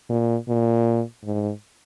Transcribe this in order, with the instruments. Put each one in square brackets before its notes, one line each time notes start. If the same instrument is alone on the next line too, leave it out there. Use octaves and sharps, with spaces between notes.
[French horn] A#2
A#2
G#2